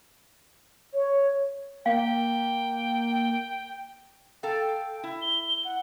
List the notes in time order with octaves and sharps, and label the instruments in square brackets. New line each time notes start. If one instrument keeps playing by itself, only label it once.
[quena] C#5
[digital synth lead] A#3 [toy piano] F5 [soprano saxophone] G5
[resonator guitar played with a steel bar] A4 F5 [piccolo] G5
[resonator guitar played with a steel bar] E4
[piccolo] G7
F#5